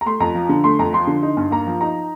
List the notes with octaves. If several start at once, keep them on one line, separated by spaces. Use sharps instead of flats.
A#5
A3 C6
F2 A#5
F3
D3
A3 C6
F2 A#5
F3 C6
D3
D#4
G2
A#3 A#5
F3
D#4 A#5